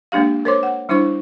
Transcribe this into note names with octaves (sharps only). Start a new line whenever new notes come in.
G#3 A#3 D4 G4 F5
A#4 C5 C#5 C6 D6
F#5
G3 D4 E4 C5 C#6